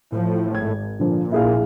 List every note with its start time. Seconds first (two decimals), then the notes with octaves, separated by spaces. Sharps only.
0.12 A2 F3
0.55 G#1 G#6
0.99 A#2 D3 F3
1.32 A#1 E4 G#4 F5